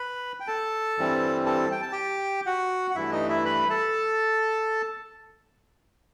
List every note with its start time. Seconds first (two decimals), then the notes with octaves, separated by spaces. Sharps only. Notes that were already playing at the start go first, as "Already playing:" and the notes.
Already playing: B4 B5
0.40 G5
0.47 A4 A5
0.98 G2 E3 G3 C4
1.46 A4 A5
1.71 G5
1.82 A5
1.92 G4 G5
2.46 F#4 F#5
2.91 F#5
2.96 G2 E3 A3 E4 E5
3.12 D#4 D#5
3.29 E4 E5
3.45 B4 B5
3.70 A4 A5